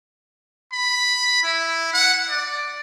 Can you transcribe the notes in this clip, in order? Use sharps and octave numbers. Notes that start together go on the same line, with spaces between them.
B5
E4
F#5
D5